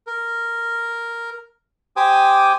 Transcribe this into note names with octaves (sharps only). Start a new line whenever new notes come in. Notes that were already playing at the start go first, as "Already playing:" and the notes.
A#4
G4 C5 G5 G#5 D6 D#6